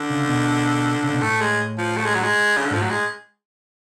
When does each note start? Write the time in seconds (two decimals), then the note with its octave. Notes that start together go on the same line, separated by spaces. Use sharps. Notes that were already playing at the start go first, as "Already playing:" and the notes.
Already playing: D3
0.10 C#3
0.29 B2
1.04 C#3
1.13 B2
1.22 A2 A3
1.41 G#3
1.78 F3
1.97 A3
2.05 G#3
2.14 F#3
2.23 G#3
2.57 C#3
2.66 D3
2.71 G#2 F3
2.81 A2 F#3
2.90 G#3